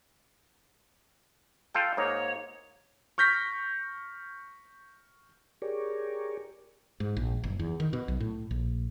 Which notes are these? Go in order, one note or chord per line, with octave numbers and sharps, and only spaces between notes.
F4 A4 G5
G#2 A#3 D#4 C#5
C#6 F6 G6 A#6 B6
G4 G#4 A#4 C#5 D5
G#2
A#1
F#1
E2
D#3
B2
B1
A2
A#1